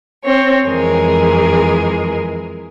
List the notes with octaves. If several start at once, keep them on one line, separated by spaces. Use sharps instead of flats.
C4 C#5
F2 E3 G#3 G#4 A#4